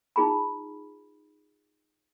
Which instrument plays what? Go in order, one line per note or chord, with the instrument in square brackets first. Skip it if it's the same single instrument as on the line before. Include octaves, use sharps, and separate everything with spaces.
[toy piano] D#4 F4 G#4 A#5 B5